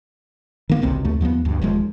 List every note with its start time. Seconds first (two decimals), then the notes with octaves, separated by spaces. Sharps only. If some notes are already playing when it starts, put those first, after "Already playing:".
0.69 D#3 A#3 B3
0.82 G#1 C#2 C3 C4
1.04 D#2 A3
1.21 D#2 F3 A#3 B3
1.45 D2 G2
1.62 D#1 D#2 F3 G#3